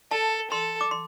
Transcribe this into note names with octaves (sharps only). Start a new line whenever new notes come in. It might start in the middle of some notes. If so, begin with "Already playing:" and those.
A4 A5
A4 C6
D6
C6